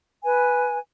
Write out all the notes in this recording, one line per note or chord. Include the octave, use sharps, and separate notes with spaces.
B4 G#5